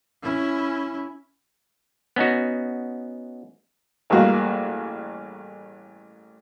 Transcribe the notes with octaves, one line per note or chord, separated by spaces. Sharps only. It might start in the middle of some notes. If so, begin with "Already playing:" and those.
C#4 E4
B3 C#4 D#4 F#4
A1 G2 G#3 A#3 F#4 F5